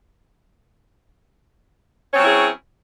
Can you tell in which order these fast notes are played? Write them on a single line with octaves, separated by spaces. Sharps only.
C#4 C4 F#3 E4 G#4